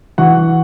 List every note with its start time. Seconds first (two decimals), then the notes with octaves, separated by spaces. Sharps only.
0.18 E3 F#4 F#5